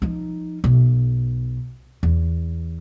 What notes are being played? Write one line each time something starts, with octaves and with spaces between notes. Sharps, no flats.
F3 D#4
B1
E2